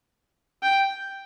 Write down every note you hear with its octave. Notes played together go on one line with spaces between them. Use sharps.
G5